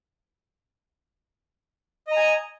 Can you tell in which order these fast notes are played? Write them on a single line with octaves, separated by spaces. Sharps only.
D#5 A#5 G#5